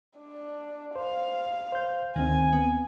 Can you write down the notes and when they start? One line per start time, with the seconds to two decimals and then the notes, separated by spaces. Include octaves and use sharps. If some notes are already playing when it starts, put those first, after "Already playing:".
0.18 D4
0.96 C5 F5
1.72 C5 G6
2.16 D2 D#3 C4 G#5
2.53 B3